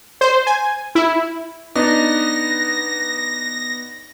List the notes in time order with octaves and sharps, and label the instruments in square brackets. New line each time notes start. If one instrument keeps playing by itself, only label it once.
[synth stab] C5
G#5
E4
[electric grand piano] B3 [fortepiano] D4 D#4 [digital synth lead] A#6